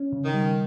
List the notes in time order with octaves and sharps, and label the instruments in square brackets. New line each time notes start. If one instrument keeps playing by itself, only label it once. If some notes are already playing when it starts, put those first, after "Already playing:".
Already playing: [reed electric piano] C#4
C#3
[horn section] D#3
[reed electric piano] G3